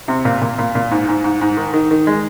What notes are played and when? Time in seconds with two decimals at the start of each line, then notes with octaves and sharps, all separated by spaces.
0.08 C3
0.25 A#2
0.41 A#2
0.58 A#2
0.75 A#2
0.91 G#2
1.08 G#2
1.24 G#2
1.41 G#2
1.57 D#3
1.74 D#3
1.91 D#3
2.07 G#3